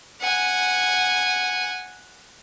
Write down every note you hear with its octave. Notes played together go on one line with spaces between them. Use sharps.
F#5 G#5